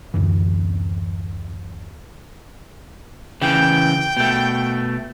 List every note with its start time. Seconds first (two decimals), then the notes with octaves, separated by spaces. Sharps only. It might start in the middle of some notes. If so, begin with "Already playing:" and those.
0.14 D1 F#2 D3 E3
3.41 C#3 E3 G5
4.17 B2 A3